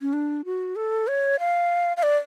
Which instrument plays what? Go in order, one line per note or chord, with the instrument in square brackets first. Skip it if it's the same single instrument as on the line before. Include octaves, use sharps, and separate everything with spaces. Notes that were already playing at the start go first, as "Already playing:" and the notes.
[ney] C#4
D4
F#4
A4
C#5
F5
F5
D5